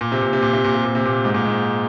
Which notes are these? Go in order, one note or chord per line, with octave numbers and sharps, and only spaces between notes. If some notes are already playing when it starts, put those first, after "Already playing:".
A#2
C3
A#2
C3
A#2
C3
A#2
C3
A#2
C3
A#2
G#2
A#2
G#2